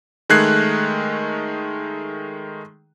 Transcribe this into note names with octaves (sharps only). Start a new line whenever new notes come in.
D#3 G#3 A3 F#6 G#6 C7